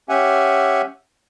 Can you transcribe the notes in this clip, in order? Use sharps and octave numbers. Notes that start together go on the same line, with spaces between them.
C#4 G4 E5 F#5 G#5